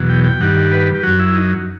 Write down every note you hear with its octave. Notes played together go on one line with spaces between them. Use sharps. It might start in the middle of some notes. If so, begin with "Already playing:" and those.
Already playing: E2 B2 F#3
G5
G5
G2 D#3 G3 F#5
B4
G4
F#2 F#3 F#4
E4
D#4